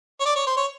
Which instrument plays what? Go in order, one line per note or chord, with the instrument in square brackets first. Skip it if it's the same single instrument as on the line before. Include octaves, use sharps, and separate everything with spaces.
[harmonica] C#5
D5
C#5
C5
C#5